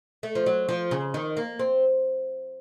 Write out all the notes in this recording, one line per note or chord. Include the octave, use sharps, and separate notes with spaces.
A3
F3
F#3
F3
C#3
D#3
A#3
C4